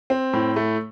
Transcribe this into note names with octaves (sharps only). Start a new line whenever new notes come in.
C4
A2
A3